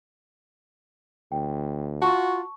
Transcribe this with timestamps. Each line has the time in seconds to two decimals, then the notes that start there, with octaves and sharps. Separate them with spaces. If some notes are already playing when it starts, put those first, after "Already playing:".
1.32 D2 G5
2.02 F4 F#4 A5 C#6